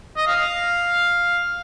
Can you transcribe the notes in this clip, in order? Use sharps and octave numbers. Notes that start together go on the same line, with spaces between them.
D#5
F5